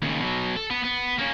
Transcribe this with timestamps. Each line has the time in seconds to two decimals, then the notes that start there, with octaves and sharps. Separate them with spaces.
0.02 D#2 C#3
0.20 B2 F#3
0.56 A4
0.70 B3
0.84 B3
1.18 A#3 C#4